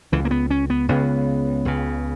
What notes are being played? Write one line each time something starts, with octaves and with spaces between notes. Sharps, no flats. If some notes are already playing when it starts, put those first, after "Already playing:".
C#2 C#3 E3
A#3
B3
C#4
B3
C#2 C#3 B3
C#2 C#3